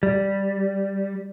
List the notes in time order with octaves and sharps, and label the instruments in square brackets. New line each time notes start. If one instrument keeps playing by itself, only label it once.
[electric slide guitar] G3